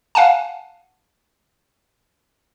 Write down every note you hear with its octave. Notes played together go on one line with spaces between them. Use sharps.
F5 F#5 G#5 A5